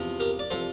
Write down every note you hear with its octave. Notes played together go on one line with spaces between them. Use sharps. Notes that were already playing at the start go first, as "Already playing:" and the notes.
Already playing: E2 C3 F3
G4 A#4
D5
C3 F3 A4 C5